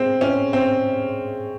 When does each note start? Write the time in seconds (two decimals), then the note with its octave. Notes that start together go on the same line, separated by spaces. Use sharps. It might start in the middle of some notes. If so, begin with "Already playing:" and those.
Already playing: G#3 C4
0.21 C#4
0.53 C4